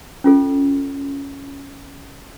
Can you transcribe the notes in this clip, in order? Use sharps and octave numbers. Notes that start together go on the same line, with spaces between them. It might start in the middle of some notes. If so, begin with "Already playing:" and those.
C#4 F4 A4